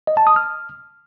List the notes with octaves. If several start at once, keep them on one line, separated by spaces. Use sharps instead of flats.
D#5
A5
D#6
F6